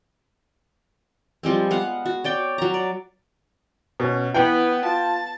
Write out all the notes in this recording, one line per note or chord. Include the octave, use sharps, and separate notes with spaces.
F3 G3 G#3 C4
B3 F5 F#5
F#4
C#5 D5 G5
F#3 A#5
D5
B2 C#4
E3 B3 G5
F4 A5